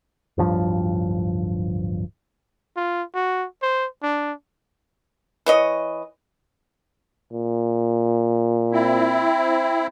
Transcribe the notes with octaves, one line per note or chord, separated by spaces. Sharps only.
D1 G2 F3
F4
F#4
C5
D4
E3 C#5 D#5
A#2
C4 E4